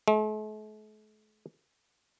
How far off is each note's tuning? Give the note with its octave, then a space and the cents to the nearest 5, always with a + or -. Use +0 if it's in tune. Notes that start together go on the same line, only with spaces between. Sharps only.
A3 -45